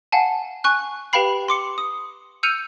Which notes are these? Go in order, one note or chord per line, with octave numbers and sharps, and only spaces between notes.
F5 F#5 G#5 A5
G#5 C#6 F#6
G4 B4 F5 G5 B5 C7
C6 D6 C#7
D#6
E6 F6 G6 C#7 D#7 F7